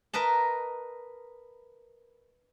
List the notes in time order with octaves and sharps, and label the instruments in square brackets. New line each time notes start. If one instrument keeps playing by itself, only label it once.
[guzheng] A#4 B4 D#5 A5